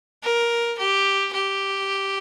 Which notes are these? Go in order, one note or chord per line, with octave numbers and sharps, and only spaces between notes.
A#4
G4
G4